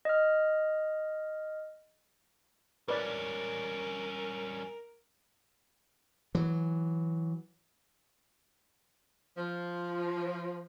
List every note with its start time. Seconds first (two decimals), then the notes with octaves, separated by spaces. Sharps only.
0.05 D#5 F6
2.88 G3 C#4 A#4 B4 D5
6.35 E3 F#3
9.38 F3